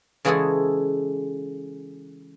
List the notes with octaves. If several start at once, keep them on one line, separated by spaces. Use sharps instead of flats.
C#3 E3 G#3 F#4 G#4 A4